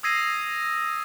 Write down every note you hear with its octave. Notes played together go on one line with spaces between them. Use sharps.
D#6 E6 G#6 A#6 C7 D#7